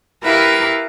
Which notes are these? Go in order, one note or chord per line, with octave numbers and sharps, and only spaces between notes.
E4 G4 A#4 B4 E5 F5